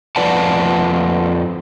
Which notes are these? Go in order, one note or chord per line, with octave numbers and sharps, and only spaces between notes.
F2 F3 B4 D5 F#5 A5